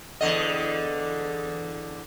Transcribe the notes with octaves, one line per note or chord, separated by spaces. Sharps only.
E2 D3 D#5